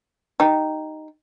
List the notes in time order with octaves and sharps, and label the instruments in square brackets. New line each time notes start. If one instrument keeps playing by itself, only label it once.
[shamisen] D#4 G4